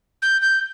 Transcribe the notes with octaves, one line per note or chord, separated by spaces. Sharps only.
G6
G6